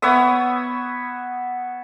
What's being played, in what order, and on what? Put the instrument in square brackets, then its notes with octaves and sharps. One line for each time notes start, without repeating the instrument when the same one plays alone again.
[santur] B3 C#5 E5 D#6